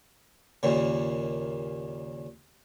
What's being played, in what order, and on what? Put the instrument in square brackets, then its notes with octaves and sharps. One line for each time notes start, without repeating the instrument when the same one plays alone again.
[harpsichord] D#2 A#2 C#3